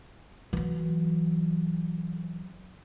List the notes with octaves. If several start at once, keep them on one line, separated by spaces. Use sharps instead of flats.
E3 F#3